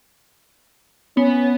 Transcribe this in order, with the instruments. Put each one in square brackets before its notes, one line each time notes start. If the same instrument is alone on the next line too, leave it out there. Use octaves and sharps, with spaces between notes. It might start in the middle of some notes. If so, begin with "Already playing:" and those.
[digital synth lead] B3 [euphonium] C#4